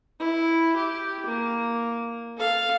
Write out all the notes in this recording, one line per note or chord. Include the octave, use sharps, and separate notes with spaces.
E4
G4
A#3
A4 F5